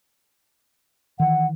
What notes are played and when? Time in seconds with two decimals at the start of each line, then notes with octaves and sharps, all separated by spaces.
1.20 D#3 E3 F#5